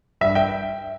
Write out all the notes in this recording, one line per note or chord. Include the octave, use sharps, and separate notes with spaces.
G2 E5
E5 G5